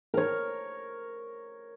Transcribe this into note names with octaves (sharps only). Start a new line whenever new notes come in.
A#4 C#5